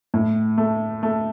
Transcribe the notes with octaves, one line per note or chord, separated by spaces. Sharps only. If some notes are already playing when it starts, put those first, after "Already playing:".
A2
A3
A3